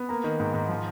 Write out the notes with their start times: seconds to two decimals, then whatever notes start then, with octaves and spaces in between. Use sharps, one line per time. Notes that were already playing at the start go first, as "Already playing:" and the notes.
Already playing: B3
0.09 A#3 A#5
0.24 D#3
0.40 G#2
0.54 G#2
0.69 F3